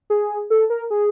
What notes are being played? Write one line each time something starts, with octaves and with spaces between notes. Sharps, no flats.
G#4
A4
A#4
G#4